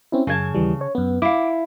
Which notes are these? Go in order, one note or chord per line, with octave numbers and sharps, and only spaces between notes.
C4 C#4 E4
F#2 C#3 D#5 A5 G#6
D#2 E3 G3
C#5
F#2 B3
E4 F5 D6